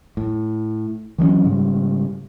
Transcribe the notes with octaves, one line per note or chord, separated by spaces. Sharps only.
A2
E3 F#3 B3 C#4
G#2 C#3 G3